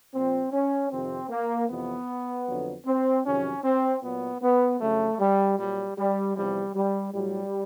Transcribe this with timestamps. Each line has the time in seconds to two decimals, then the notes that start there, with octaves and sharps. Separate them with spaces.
0.13 A#2 F3 C4
0.52 C#4
0.91 F2 C3 D#3 C4
1.30 A#3
1.69 F2 C3 E3 B3
2.47 F2 D3 F#3
2.86 C4
3.25 F2 C3 D#3 F#3 C#4
3.63 C4
4.02 A#2 F#3 B3
4.42 B3
4.80 F2 C#3 F#3 A3
5.19 G3
5.58 A#2 F#3 G3
5.98 G3
6.36 E2 C3 F3 G3
6.75 G3
7.13 A2 F#3 G3